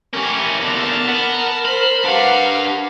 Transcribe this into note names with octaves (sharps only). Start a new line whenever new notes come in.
E3 C#4 G4 A#4 G#5
E2 D3 A5 F6
B4 F#5
C5 B5
D4 G4 B4 F5 F#5